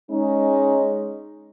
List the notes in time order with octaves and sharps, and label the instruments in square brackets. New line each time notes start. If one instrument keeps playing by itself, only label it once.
[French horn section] G#3 C#4 D#4